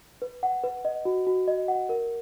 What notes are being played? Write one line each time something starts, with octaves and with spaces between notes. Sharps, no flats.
B4
F#5
B4
D#5
F#4
F#4
D#5
F#5
A#4